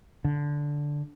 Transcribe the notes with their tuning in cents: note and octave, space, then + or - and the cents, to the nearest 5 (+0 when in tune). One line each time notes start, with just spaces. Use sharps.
D3 -5